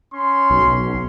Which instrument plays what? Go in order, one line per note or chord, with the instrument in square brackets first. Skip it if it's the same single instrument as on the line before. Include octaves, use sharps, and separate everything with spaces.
[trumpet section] C#4 C6
[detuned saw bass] B1